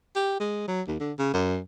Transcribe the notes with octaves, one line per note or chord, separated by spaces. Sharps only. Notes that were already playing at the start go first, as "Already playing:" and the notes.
G4
G#3
F#3
D#2
D3
C#3
F#2